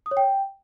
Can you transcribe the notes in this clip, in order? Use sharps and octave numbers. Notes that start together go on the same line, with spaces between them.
D#6
C#5
G5